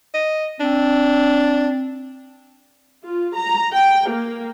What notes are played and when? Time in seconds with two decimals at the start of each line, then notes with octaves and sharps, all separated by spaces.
0.15 D#5
0.61 C4 D4
3.06 F4
3.36 A#5
3.72 G5
4.10 A#3